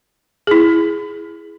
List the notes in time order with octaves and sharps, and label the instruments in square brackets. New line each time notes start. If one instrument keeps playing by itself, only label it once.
[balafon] E4 G#4